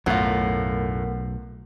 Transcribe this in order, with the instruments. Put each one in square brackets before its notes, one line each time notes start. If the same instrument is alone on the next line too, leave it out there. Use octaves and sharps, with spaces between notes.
[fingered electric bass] B1 [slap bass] F#2 A2 [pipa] F#3 F4 [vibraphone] A3 A#4 F#5